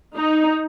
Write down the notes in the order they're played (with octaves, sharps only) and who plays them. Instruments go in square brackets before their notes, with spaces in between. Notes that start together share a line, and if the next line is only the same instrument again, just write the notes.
[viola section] D#4